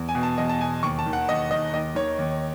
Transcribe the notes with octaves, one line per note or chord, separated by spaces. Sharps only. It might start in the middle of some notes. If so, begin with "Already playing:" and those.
Already playing: E2
G#5
B2
A5
E2 D#5
A5
B2 G#5
D#2 C#6
A5
D#3
F#5
D#2 D#5
D#3 D#5
D#2 D#5
D#3 C#5
D#2